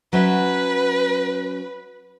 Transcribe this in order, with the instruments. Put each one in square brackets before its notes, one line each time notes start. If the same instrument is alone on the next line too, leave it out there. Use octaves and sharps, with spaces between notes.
[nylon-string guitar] F#3 C#4 E5 [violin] B4